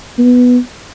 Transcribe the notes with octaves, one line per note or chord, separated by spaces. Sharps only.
B3